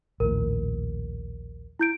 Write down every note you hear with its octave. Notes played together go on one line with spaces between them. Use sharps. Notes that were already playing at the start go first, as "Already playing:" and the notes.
A#1 D#2 A2 A#4
E4 G6 D7